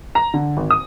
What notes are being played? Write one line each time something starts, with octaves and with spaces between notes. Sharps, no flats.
A#5
D3
G#1
D#6